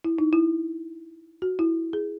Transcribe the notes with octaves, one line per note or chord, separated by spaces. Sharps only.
E4
D#4
E4
F#4
E4
G#4